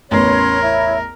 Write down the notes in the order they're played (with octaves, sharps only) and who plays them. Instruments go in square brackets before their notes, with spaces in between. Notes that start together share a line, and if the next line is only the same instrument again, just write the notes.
[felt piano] A1 E2 [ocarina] C#4 [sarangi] A#4 [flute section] B4 C#5 C6
[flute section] E4 C#5 [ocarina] E5